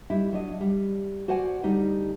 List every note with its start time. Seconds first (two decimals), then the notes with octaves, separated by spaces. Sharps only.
0.10 G3 D#4 E4
0.32 F#3 D4 D#5
0.61 G3
1.28 F#4 C5 D5 F#5 G#5
1.63 D2 G3 D#4